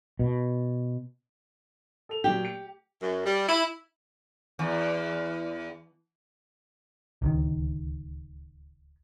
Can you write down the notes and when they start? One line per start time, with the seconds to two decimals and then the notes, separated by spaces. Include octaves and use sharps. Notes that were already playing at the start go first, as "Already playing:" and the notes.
0.19 B2
2.09 A4 F7
2.24 A#2 F#3 G4
2.45 C#7
3.00 F#2
3.25 G3
3.47 E4
4.59 E2
7.22 D1 C#2 D#3